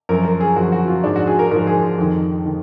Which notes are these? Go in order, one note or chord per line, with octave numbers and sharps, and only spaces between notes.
F#2 F3 A#4
A#4
G#4
F#2 F3 F#4
F#4
F4
G#2 F3 D4
F#4
G#4
A#4
G#2 F3 A#4
G#4
F2 D#3
D#3